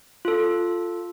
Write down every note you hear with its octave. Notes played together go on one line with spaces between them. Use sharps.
F4 A4